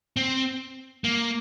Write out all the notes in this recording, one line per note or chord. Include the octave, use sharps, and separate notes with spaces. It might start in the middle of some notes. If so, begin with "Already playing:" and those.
C4
A#3